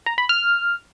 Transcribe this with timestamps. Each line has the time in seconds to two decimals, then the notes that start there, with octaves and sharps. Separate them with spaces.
0.06 A#5
0.18 B5
0.29 F6